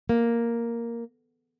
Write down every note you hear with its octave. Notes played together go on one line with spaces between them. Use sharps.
A#3